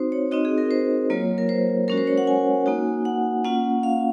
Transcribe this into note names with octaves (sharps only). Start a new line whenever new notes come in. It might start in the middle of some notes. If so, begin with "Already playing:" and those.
Already playing: C4 D#4 F#4 C5
C#5
C4 D#4 F#4 D#5
G#4
A#4
C5
F#3 A#3 F4 C#5
A#4
C5
G#3 C#4 F#4 A#4
C5
C#5
F#5
G#5
A#3 D#4 F#4
F#5
A#3 C#4 F4 F#5
F5